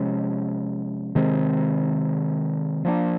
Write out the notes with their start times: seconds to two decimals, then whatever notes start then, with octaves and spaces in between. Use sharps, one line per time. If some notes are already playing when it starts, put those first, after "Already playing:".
Already playing: C3 F3 G#3 C#4
1.15 C3 D#3 G#3 C4
2.85 F3 A#3 D4